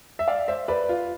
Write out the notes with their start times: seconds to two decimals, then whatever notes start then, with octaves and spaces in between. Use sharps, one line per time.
0.19 E5
0.28 D5 F5
0.48 C5 E5
0.68 B4 D5
0.89 F4